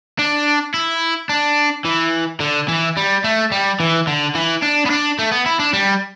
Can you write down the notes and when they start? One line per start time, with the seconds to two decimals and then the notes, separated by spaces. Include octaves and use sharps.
0.19 D4
0.74 E4
1.29 D4
1.85 E3
2.40 D3
2.68 E3
2.97 G3
3.24 A3
3.52 G3
3.80 E3
4.07 D3
4.35 E3
4.62 D4
4.86 B3
4.90 D4
5.19 A3
5.31 B3
5.46 E4
5.59 D4
5.73 G3